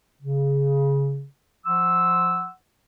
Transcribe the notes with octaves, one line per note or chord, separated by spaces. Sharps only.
C#3
F3 F#5 C6 D6 E6